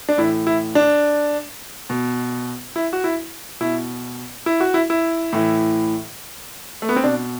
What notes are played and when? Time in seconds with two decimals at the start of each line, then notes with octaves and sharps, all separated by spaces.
0.09 D4
0.18 A2 E3 E4
0.47 E4
0.75 D4
1.90 B2
2.76 E4
2.93 F#4
3.04 E4
3.61 B2 E4
4.46 E4
4.60 F#4
4.74 E4
4.90 E4
5.33 A2 E3
6.82 A3
6.89 B3
6.96 C4
7.04 B2 D4